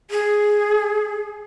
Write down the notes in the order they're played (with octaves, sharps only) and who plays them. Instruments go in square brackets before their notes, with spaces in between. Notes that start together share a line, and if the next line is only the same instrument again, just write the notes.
[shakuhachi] G#4